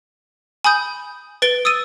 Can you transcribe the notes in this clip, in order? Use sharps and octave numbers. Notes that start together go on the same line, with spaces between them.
G#5 B5 D#6 G6
B4 A6 D7 G7
D#6 E6 A6 D#7